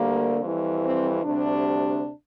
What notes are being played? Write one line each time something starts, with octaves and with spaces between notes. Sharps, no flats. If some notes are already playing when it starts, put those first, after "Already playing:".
Already playing: D2 D3 G3 A#3
F2 E3 G3
C4
D2 C3 G3 D4